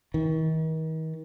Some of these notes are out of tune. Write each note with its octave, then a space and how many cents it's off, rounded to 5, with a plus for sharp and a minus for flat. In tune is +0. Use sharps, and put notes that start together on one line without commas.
D#3 +40